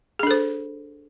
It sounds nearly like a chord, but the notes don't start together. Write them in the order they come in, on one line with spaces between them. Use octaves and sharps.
G#4 D4 A4 C5